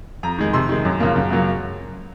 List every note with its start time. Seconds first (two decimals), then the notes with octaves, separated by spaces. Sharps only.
0.23 F2 A#5
0.39 D#3 G#3
0.53 C3 C6
0.69 D#3 G#3
0.85 F#2
1.00 C#3 F3 A#3
1.16 F#2
1.31 C#3 F#3 A#3